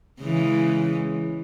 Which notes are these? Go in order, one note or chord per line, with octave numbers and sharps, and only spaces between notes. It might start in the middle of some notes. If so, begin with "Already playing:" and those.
C#3 E3 G#3